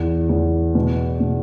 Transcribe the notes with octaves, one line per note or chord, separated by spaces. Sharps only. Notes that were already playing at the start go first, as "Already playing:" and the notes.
Already playing: E2
E2
B2
B2